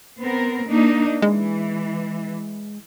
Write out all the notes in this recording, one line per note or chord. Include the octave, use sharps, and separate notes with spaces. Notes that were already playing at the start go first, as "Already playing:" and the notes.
B3 C4 A#4
A#3 D4 D#4
E3 G#3